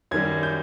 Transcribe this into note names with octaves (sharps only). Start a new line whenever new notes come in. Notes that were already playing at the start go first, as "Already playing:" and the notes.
F#2 D#3 G3 G#6
G6